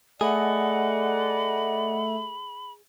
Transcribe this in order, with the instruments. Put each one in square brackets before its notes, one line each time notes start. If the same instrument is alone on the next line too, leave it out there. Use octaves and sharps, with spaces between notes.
[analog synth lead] A3 [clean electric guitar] G#4 [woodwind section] D5 D#5 F#5 [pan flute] B5